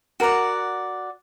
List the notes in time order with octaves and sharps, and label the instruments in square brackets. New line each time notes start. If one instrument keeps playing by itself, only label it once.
[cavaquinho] F#4 A#4 D5 F#5